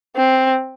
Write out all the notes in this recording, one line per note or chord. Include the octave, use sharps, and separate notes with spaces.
C4